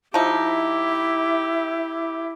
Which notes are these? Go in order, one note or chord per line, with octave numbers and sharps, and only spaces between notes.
F3 D#4 E4 G4